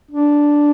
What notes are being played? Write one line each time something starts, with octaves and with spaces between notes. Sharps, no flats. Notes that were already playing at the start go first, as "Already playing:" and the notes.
D4